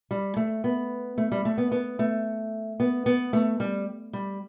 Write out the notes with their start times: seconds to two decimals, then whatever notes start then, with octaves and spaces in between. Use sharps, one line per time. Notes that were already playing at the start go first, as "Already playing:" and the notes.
0.11 G3
0.37 A3
0.64 B3
1.18 A3
1.32 G3
1.45 A3
1.58 B3
1.72 B3
1.99 A3
2.80 B3
3.06 B3
3.33 A3
3.60 G3
4.13 G3